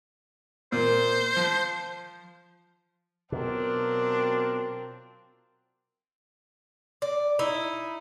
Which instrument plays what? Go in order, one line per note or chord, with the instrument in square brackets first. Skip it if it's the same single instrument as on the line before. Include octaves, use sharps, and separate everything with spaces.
[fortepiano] A#2 A#3 [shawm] C5
[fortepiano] F3
[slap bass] B2 [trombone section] F#3 F4 A#4 [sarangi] C4 [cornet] D4
[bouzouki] D5
D#4 E4